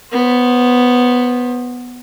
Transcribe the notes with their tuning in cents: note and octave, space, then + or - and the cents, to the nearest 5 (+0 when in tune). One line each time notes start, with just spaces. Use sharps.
B3 +0 C5 +25